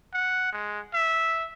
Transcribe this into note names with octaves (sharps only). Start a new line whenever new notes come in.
F#5
G#3
E5